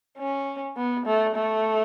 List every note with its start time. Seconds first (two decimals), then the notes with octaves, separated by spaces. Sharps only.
0.18 C#4
0.76 B3
1.06 A3
1.35 A3